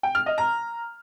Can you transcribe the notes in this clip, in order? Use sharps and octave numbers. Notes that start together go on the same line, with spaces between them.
G5
F6
D#5
A#5